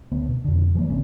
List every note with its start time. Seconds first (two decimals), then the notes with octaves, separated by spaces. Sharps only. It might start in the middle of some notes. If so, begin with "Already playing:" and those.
0.12 D2 B3
0.29 B2
0.44 F2 D3
0.75 E3 F3 A#3
0.89 G#1 G#2 C#3 C4